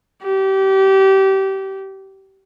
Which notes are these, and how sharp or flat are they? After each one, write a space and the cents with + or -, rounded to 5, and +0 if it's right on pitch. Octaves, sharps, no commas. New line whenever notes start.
G4 -25